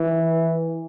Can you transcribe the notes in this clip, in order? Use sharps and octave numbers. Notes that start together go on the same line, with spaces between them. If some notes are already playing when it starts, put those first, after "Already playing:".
Already playing: E3